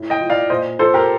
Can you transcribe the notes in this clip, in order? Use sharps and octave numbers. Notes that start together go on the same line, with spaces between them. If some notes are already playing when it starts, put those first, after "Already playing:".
Already playing: A2
D#5 G5
F3
D5 F5
A#2 C5 D#5
F3 A4 C5
G4 A#4